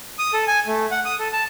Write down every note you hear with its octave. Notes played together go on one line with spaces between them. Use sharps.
D#6
A4
G#5
A3
F#5
D#6
A4
A5